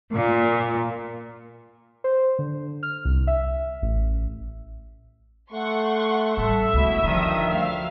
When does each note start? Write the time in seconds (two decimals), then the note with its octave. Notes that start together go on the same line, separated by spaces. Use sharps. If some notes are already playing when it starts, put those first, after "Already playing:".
0.12 A#2
2.04 C5
2.39 D3
2.83 F6
3.05 C2
3.27 E5
3.82 A1
5.52 A3 F#5 C6 C#6
6.37 A1 G3 A3 A4 E5
6.74 D2 B2 G#3 E4
7.04 G2 D3 D#3 F3 D#6
7.50 D2 F3 F5